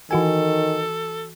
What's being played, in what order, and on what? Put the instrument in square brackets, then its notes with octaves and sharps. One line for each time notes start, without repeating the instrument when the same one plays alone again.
[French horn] D#3 [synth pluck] E3 F#4 G#5 [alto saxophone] A4